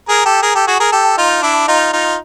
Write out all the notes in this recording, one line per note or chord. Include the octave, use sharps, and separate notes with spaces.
G#4 A#4
G4 A4
G#4 A#4
G4 A4
F#4 G#4
G#4 A#4
G4 A4
D#4 F4
D4 E4
D#4 F4
D#4 F4